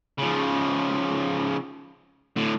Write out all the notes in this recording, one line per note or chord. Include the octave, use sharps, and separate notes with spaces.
C#3 F3
A2 D3